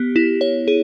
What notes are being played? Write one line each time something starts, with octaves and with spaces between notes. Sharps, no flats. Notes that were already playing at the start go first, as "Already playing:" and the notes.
Already playing: B3 G4
E4
C#5
G#4